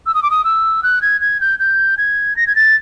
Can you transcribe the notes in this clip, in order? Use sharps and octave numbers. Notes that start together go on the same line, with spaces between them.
E6
D#6
D6
D#6
E6
F#6
G#6
G#6
G6
G6
G#6
A#6
G#6
A6